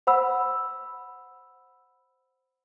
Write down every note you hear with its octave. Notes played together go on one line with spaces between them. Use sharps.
C5 F#5 B5 E6